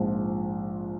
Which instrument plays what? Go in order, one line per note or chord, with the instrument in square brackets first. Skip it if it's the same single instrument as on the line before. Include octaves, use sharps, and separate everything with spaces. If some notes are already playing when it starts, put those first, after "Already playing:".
Already playing: [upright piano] A#1 G#2 F3